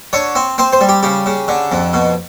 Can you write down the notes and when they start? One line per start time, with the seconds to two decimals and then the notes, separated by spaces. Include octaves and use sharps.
0.13 D3 C#5
0.35 C4
0.58 C4 C5
0.73 C5
0.81 G3
0.89 G4
1.03 C#3 G4
1.26 C#3
1.48 D3
1.72 F2
1.93 B2